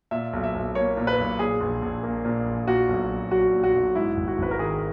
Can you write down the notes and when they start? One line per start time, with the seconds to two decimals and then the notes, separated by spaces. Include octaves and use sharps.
0.11 A#2 E5
0.33 B1
0.43 E5
0.54 B1
0.75 A#3 C#5
0.97 A#2
1.07 B4
1.18 B1
1.39 A#2 G#4
1.61 A#1
1.82 A#1
2.03 A#3
2.25 A#2
2.46 A#1
2.68 A#2 F#4
2.89 B1
3.10 B1
3.31 F#3 F#4
3.53 A#2
3.64 F#4
3.74 B1
3.95 G#2 E4
4.17 G#1
4.28 F#4
4.38 G#1 B4
4.51 A#4
4.59 D#3 G#4